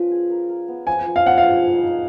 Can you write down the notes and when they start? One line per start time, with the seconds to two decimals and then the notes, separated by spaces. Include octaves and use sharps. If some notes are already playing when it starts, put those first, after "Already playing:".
Already playing: F3 C#4 F4 B4
0.11 G#4
0.30 A#4
0.49 A#4
0.68 B3
0.87 F3 G#5
1.06 F3
1.16 F5
1.25 F3 F#5
1.38 F5
1.45 G#4
1.64 D#4
1.83 D#4